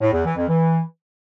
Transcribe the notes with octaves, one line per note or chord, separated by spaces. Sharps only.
A2
E2
E3
F2
E3